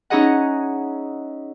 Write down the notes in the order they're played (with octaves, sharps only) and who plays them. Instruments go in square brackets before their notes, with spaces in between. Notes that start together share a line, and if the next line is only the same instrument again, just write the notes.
[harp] C#4 D#4 E4 G#4 D#5 F#5